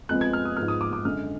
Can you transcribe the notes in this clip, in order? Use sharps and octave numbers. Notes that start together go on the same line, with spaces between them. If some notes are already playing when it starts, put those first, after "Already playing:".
F2 F3 G#3 B3 F#6
G#6
F6
D#6
G#2 F3 B3 F6
D#6
D6
D6
F#2 D3 G#3 F6